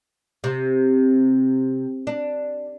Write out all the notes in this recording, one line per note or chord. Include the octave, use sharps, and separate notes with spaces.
C3
D4